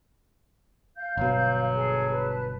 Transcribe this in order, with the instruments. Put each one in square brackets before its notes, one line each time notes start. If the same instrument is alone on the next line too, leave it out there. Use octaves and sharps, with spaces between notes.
[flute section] F5 G6
[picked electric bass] G1 B2 [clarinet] F#3
[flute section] G#4 A4
B4 A5